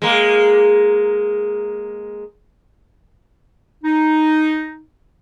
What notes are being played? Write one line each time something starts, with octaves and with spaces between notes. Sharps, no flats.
G#3 A#3
D#4